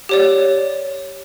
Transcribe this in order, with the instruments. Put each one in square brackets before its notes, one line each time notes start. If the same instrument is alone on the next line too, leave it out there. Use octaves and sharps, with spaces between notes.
[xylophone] G4 C#5 D5